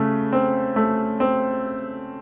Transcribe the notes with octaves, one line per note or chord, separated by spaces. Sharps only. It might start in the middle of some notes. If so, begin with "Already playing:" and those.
Already playing: C#3 A3
C4
A3
C4